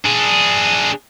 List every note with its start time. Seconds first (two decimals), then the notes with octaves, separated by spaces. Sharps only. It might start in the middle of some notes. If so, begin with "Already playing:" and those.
0.05 D4 G#4